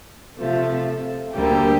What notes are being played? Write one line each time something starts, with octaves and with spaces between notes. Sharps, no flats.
C3 F3 A3 A4
D2 D3 G3 A#3 G4